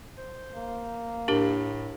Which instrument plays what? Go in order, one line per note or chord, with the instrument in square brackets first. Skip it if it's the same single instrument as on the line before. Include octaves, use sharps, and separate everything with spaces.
[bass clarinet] C5
[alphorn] A#3
[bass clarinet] A2 [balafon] D4 G4 A#4